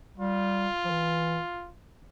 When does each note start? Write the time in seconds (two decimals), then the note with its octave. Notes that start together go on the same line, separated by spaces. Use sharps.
0.18 G3 F4
0.84 F3
0.90 E3